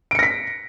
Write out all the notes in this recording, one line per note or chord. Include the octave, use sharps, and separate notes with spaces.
A#6 B6 C#7 D7